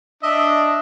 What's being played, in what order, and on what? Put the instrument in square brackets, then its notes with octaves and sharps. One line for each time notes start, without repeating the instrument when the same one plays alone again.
[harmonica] D4 D#5 E5